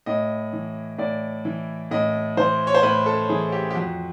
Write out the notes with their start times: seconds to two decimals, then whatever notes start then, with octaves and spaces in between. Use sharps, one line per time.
0.06 A2 D#5
0.53 E3
0.98 A2 D5
1.45 E3
1.91 A2 D#5
2.37 E3 C5
2.67 C#5
2.74 C5
2.83 A2 B4
3.06 A4
3.29 E3 G#4
3.52 G4
3.70 G4
3.75 F2 F#4